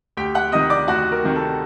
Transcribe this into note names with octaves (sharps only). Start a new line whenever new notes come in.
D2 G4 G5
F#5 F#6
C3 D#3 D#5 D#6
D5 D6
D2 F#4 F#5
A#4
C3 D#3
A4